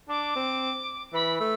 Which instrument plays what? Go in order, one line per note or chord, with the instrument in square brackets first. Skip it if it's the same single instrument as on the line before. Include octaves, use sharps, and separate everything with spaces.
[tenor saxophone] D4 [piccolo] D6
[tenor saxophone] C4
[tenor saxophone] E3 [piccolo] B5
[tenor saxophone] A3 [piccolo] E6